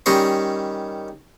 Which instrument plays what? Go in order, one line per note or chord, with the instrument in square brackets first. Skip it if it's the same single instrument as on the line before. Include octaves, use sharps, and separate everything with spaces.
[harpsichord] D#3 G3 C#4 D#5 C6 C#6